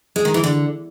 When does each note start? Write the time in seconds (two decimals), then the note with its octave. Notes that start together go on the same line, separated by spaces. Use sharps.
0.16 G#3
0.25 D#3
0.34 E3
0.44 D3